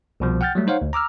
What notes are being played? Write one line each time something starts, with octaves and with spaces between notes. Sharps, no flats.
C2 B2 F3
F#5 G5 F6 G6 A6
F#3 G3 A3
D#4 C5 C#5 F5 F#5
D2
A#5 D6 E6 F6